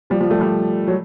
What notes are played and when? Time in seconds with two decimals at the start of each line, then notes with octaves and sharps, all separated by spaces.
0.10 F3 G3
0.20 F3 G3
0.30 G3 A3
0.40 F3 G3
0.87 F#3